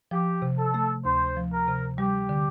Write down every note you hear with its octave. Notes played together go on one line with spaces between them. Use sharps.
F3 G4
C3
A4
A3
D2 C5
F3
A#4
C3
G3 G4
D3